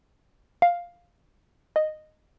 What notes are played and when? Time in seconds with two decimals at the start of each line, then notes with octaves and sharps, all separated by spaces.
0.62 F5
1.76 D#5